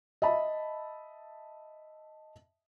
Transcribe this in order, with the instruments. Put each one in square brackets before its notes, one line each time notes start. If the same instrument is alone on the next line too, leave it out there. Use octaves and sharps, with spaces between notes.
[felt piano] D#5 E5 A5 B5